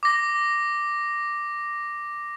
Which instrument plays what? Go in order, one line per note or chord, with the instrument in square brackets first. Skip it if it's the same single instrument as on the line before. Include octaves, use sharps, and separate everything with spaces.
[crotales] D6 A#6